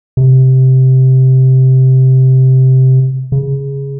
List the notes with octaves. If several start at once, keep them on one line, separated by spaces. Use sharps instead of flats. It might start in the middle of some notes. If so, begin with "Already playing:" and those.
C3
C#3